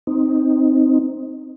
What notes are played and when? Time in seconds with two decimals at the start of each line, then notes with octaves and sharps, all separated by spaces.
0.07 C4 D#4